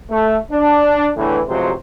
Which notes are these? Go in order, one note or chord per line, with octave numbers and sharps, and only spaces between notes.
A3
D4
E2 A2 D3 E3
A1 C3 F3 F#3 G#3 C5